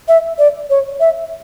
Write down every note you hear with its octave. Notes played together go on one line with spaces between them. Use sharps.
E5
D5
C#5
E5